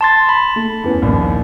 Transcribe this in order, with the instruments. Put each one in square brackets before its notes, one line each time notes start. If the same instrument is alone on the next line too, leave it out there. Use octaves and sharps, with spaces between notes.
[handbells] A5 C6 A6
B5
[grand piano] A3
E2 B3 C#4
A#1 D#2